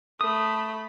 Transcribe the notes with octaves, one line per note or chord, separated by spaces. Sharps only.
A3 B5 D#6